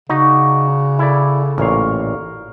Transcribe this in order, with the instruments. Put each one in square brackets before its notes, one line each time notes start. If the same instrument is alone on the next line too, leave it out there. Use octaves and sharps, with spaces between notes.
[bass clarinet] C#3 [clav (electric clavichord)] D#4 [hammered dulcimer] F#4 D5
[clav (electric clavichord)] E4 D5 [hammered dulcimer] A4
[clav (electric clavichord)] A1 A#2 F5 [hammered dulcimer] A#4 C#6